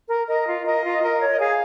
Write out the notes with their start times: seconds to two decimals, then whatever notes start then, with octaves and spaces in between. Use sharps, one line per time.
0.08 A#4
0.27 A#4 D#5
0.46 F4
0.65 A#4 D#5
0.84 F4
1.02 A#4
1.20 C#5
1.30 D#5
1.39 G#4 F5